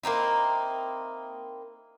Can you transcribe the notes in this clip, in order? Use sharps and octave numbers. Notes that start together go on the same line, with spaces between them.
A#3 C4 D#4 E4